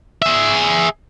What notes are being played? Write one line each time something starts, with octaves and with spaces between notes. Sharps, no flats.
G#4 E5